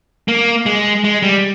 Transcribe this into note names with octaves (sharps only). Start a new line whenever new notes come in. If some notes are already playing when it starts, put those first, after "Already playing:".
A#3
G#3
G#3
G3